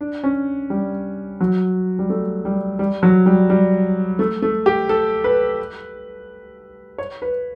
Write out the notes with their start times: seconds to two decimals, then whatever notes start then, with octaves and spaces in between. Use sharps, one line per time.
0.01 D4
0.23 C#4
0.70 G3
1.41 F#3
1.99 G3
2.10 A3
2.45 G3
2.79 G3
3.03 F#3
3.26 G3
3.50 G3
4.19 A3
4.42 A3
4.66 G4
4.89 A4
5.24 B4
6.98 C#5
7.22 B4